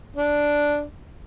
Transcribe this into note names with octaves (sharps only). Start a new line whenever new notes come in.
D4